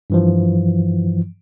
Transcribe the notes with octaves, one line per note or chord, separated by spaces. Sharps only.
G2 E3 F3